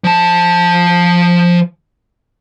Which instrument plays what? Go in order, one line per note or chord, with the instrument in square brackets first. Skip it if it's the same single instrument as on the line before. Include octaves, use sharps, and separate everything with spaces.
[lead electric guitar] F3 A5